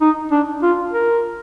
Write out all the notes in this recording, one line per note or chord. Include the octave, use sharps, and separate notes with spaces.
D#4
D4
F4
A#4